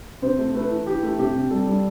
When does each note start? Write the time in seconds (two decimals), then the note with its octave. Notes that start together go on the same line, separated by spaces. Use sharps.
0.22 C3 C5
0.39 A3
0.55 A3 B4
0.71 E3
0.86 E3 G4
1.03 A3
1.19 C3 G4
1.35 C3
1.50 G3 A4
1.67 G3